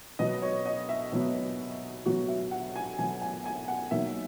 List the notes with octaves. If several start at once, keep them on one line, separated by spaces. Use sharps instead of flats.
B2 F#3 B3 D#5
C#5
D#5
E5
B2 F#3 B3
B2 F#3 B3 F#4
E5
F#5
G#5
B2 F#3 B3 G#5
G#5
G#5
F#5
B2 F#3 A#3 D#4 E5